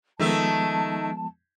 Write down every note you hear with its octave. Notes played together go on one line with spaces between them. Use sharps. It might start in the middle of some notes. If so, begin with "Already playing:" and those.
D#3 F3 G#3 A3 B3 A5